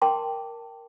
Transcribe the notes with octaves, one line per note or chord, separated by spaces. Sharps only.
A#4 G5 A5 C6 D6